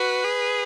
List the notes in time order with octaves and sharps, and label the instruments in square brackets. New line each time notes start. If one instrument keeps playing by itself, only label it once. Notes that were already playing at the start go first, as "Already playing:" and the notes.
Already playing: [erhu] F#4 [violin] B4
[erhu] G#4